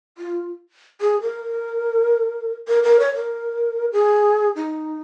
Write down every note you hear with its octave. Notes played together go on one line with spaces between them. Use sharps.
F4
G#4
A#4
A#4
A#4
C#5
A#4
G#4
D#4